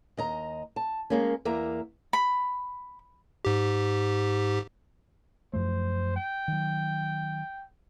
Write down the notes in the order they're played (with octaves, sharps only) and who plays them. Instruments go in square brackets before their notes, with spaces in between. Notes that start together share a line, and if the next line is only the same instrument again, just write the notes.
[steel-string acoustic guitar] D#2 D#5 A#5
A5
G#3 A#3 C#4
E2 A#3 E5 A#5
[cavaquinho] B5
[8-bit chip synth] G#2 G4
[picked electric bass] F#2 F3 A3 [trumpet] C5
[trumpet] G5
[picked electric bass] D#3 F#3